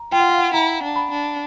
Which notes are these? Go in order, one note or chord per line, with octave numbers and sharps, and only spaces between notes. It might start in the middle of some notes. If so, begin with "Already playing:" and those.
Already playing: A#5
F4 G5
F#5
F5
F#5
E4 A#5
D4
B5
D4